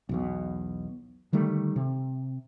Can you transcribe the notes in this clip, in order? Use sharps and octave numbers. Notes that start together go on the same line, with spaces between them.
B1 E2 B2
D3 D#3 G3 A3
C3